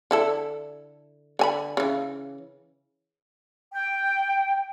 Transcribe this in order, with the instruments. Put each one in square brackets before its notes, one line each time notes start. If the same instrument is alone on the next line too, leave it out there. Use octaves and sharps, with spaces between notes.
[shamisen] D3 E4 A4
D3 G#5 B5
C#3 E3
[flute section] G5